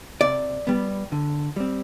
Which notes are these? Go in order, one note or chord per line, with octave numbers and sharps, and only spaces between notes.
C3 D5
G3 B3
D3
G3 C4